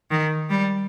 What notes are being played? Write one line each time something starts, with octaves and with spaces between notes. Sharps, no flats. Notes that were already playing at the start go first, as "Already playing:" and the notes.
D#3
G3